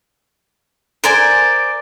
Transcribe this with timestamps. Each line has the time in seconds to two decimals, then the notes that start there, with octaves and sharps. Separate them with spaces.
1.04 A#4 C5 D5 G#5